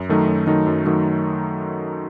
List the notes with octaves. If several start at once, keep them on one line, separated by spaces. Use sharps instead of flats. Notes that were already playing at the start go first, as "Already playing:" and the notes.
Already playing: F#2
D#3 F#3 A3 D#4
F#2
D#3 F#3 A3 D#4
F#2
D#3 F#3 A3 D#4